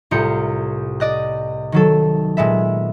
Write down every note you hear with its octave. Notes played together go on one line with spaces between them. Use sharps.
C2 A2 F4 A#5 G6 C#7
D5 D#5 F#6
D#3 F#3 A4
A#2 G#3 B3 E5